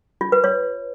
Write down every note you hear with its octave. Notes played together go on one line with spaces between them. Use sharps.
F4
B4
C#5